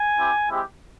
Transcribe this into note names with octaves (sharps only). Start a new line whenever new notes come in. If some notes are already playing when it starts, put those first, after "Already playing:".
Already playing: G#5
C4 E4 G4
G#3 C4 E4 G4